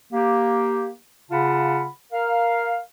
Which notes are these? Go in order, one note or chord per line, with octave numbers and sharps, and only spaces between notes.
A#3 G4
C#3 F4 F#5 A5 B5
A#4 F5